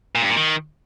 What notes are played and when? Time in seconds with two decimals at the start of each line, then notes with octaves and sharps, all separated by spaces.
0.15 A#2
0.22 G2
0.30 A#2
0.37 D#3